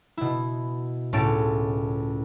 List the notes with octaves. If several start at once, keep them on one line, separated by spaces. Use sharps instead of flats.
B2 E4
C#2 A2 C#4 A5 A6 D7